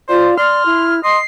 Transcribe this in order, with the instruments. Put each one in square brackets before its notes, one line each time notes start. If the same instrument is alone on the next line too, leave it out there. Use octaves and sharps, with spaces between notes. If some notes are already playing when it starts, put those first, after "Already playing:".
[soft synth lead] F4 [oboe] C5 [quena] D5
[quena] D5 [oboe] C6 [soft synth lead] F6
[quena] E4
[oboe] D#5 [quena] C6 [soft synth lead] C7